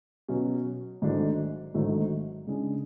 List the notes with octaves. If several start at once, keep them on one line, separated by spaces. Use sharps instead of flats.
B2 F#3 C#4
G#1 G#2 F#3 A3 D4
G#1 G#2 F#3 A3 D4
C#3 G#3 D4 G#4